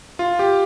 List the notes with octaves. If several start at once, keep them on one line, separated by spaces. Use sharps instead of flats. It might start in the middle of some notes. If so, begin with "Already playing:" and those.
F4
G4